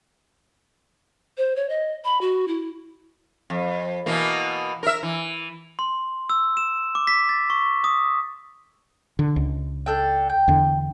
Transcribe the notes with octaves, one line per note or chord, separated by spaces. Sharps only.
C5
C#5
D#5
B5
F#4
E4
F2
B2 E3 A#3
A#4 E5
E3
C6
E6
E7
D6
B6
A6
C#6
D#6
D3
C#2
D4 A4 G5
G5
E2 D3